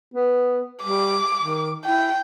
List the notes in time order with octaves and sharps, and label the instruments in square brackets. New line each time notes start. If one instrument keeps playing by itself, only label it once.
[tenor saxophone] B3
[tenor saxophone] G3 [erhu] D6
[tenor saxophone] D#3
[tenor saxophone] E4 [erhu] G5